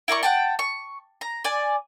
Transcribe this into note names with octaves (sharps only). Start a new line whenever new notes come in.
E4 A#4 D5 C#6
F#5 G5 A5
C#6
A#5
D5 G#5